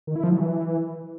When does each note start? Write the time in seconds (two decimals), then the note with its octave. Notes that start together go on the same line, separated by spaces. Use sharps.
0.07 D#3
0.16 E4
0.24 F3
0.32 F#3
0.40 E3